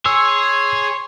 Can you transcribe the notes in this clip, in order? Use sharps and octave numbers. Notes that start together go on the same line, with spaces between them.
G#4 C#5 G#5 C6 E6